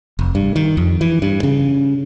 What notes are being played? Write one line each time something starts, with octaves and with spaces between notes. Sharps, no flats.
F1
G2
D#3
F2
E3
G2
C#3